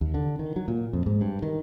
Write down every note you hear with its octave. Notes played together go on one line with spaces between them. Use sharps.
D#2
D3
D#3
F#3
A#2
F2
G#2
G2
D#3